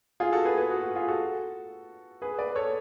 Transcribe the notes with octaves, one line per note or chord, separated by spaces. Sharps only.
F4 G#4
F#4 A4
G#4 B4
G#4 B4
F#4
F#4
F4 G#4
F#4 A4
G#4 B4
B4 D5
A4 C#5